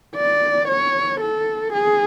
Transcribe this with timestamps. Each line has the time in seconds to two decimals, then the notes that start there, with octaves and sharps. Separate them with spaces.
0.16 D5
0.69 C#5
1.21 A4
1.74 G#4